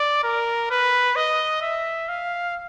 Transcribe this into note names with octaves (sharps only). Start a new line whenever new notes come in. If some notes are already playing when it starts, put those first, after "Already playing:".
Already playing: D5
A#4
B4
D#5
E5
F5